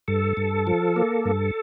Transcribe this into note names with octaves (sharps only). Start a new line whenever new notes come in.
G2 A4
G2
F3
A#3
G2